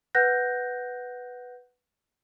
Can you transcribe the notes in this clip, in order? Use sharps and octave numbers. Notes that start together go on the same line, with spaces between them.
B4 F#5 F#6 G6 A#6